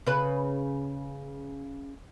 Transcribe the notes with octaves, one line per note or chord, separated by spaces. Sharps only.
C#3 B4